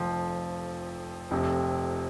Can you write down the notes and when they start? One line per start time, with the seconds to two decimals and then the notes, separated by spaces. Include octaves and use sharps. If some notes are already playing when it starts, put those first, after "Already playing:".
Already playing: F1 F2 F3
1.31 F1 F2 C3